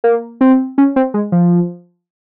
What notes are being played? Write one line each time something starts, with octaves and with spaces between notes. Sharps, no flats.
A#3
C4
C#4
C4
G#3
F3